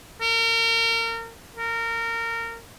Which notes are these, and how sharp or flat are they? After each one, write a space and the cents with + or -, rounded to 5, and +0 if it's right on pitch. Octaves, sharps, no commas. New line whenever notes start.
A#4 -30
A#4 -20